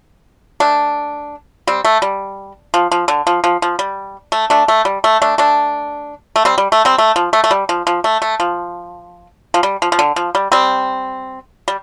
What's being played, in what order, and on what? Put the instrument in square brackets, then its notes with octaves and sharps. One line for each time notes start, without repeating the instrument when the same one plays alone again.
[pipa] A3 D4
G3 C4
A3
G3
F3
F3
D3
F3
F3
F3
G3
A3
A3 D4
A3
G3
A3
A3 D4
A3 D4
A3
G3 C4
G3
A3
G3 C4
A3
F3
A3
A3
G3
F3
F3
A3
A3
F3
F3
G3
F3
F3
D3
F3
G3
G3 C4
G3